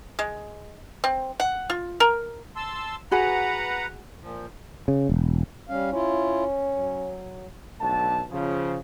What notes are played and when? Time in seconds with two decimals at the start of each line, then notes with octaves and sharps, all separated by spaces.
0.19 G#3
1.04 C4
1.40 F#5
1.70 F4
2.00 A#4
2.56 A5 C6 E6
3.11 F#4 G#4 B4 F#5 A#5 B5
4.22 A#2 F3
4.88 C#3
5.09 E1
5.69 G3 C#4 F5
5.92 C#4 E4 F4
6.72 F#3
7.80 B1 D3 A3 A5
8.30 C#3 F3